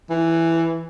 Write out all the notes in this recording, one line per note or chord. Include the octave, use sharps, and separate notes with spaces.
E3